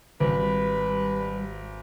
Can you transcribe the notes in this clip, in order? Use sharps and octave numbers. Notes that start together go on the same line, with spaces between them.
G#1 G3 B4